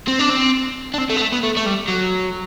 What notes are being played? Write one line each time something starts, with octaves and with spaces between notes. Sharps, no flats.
C4
D4
C4
D4
C4
A3
B3
A3
B3
A3
A3
G3
F#3